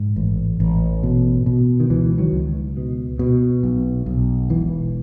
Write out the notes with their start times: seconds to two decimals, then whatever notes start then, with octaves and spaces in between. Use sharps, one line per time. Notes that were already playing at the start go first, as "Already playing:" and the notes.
Already playing: G#2
0.16 A1
0.60 A1
1.03 B2
1.46 B2
1.80 D#3
1.90 C#2 E3
2.18 D#3 F#3
2.33 C#2
2.77 B2
3.19 B2
3.63 B1
4.06 B1
4.49 E1 E3